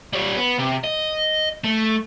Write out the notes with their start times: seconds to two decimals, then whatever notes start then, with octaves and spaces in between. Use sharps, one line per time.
0.13 G3 C#5
0.37 B3
0.59 C3
0.84 D#5
1.64 A3